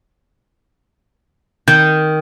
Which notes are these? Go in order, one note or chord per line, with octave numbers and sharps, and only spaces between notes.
D#3 G6